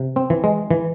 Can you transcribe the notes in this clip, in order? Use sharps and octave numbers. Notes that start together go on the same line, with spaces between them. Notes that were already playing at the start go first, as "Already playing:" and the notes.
Already playing: C3
C4
E3
G#3
E3